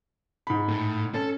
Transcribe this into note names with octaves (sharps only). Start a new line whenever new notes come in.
G#2 B5
A2
C#4 A4